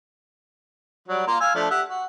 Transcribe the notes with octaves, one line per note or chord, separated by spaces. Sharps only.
F#3 G3 F#4
A#3 F4 A#4
F5 G#5 E6
F3 A3 D4
G4 E5 F#5
F#4